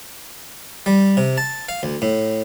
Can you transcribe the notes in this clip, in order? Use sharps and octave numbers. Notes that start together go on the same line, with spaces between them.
G3
C3
A5
F5
D2
A2